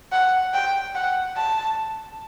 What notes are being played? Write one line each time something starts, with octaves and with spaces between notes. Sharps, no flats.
F#5
G5
F#5
A5